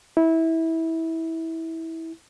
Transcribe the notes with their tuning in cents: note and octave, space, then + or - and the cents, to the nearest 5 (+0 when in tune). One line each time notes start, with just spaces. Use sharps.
E4 -20